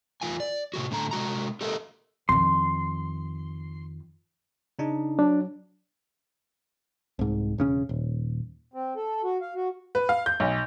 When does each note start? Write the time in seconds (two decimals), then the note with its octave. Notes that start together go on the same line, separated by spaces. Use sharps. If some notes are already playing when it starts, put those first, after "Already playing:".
0.21 E2 G2 F4 G#5
0.40 D5
0.74 A2 C3 G#3 F#4
0.91 A2 D3 A#5
1.11 C3 G#3 F#4 A#5
1.61 G4 A4 A#4 D#5 F5
2.29 F2 D#3 C6
4.79 C#3 D4 D#4
5.19 F#3 D4
7.19 C2 G#2
7.58 E1 C#3 C#4
7.89 D#1
8.74 C4
8.96 A4
9.24 F#4
9.41 F5
9.55 F#4
9.95 B4
10.09 F5
10.26 G6
10.40 B1